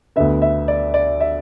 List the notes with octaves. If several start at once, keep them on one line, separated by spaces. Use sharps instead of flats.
D2 D3 B3 E5
E5
D5
D5
E5